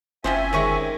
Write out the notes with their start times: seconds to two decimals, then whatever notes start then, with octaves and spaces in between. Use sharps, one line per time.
0.24 F#1 F3 C4 C#4 C5 E5 G#5
0.53 C3 D#3 G#3 C#4 C#6